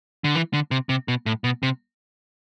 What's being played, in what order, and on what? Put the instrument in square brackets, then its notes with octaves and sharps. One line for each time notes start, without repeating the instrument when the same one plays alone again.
[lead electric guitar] D3
E3
D3
C3
C3
B2
A2
B2
C3